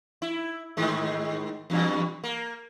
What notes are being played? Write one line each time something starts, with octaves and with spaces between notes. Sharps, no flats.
E4
G#2 D#3 G#3
E2 G2 B2
A#3